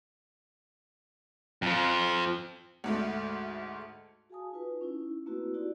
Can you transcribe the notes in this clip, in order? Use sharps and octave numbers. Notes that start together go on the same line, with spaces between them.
F2 F3
D2 G#2 A3
F#4 G#4 F5 G#5 A5 D#6
D#4 F4 B4
C#4 D#4 E4
A3 A#3 C4 E4 F#4 B4
D#4 E4 F#4 G4 D5